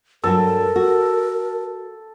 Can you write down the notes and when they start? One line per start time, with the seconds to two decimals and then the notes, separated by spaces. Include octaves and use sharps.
0.24 G2 F#3 F#4 A4 A#4
0.76 F#4